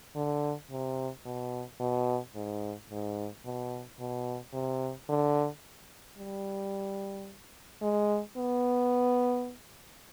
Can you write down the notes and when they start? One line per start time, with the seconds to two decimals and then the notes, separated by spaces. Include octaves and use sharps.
0.16 D3
0.71 C3
1.25 B2
1.80 B2
2.35 G#2
2.89 G#2
3.45 B2
3.99 B2
4.53 C3
5.09 D3
6.18 G3
7.82 G#3
8.37 B3